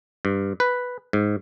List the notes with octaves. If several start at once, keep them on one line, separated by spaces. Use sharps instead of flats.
G2
B4
G#2